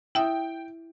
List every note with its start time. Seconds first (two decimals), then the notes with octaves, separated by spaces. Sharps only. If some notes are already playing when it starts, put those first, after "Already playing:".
0.15 E4 E5 G5 D#6